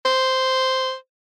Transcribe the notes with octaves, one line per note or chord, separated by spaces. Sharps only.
C5